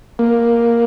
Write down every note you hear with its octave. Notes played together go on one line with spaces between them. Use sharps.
A#3